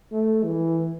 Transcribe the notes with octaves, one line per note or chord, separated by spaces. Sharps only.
A3
E3